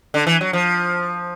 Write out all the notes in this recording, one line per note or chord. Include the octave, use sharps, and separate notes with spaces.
D3
E3
F#3
F3